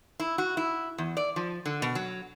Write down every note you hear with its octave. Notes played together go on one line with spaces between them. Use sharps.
E4
F#4
E4
E2
D5
F3
D3
B2
F#3